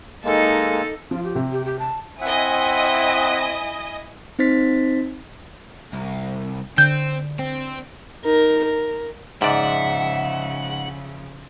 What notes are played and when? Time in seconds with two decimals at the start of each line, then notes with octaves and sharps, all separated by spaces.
0.24 G#3 A#3 D#4 A4
1.11 F3 F4
1.24 G4
1.35 C3
1.52 G4
1.65 G4
1.79 A5
2.21 C4 E4 D#5 E5 F#5 G#5 D#6
4.39 C4 D#4 C5 A6 B6
5.93 C2
6.78 D3 C4 G6
7.39 C4
8.24 D#4 A#4
8.65 A#4
9.42 G#2 C#3 F3 D5 E5 F#5